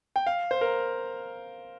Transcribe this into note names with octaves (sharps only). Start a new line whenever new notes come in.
G5
F5
C5
A#4